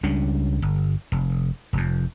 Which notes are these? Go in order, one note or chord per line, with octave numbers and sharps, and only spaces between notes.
C#2 G3 C#4 D4
G1
F1
F1 F2